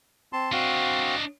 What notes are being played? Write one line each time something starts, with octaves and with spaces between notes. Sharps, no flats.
C4 A5 C6
C4 D4 F#4 D#5 F5